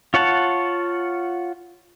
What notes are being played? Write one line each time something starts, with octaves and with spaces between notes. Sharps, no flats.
F4 C#5 F#5 A5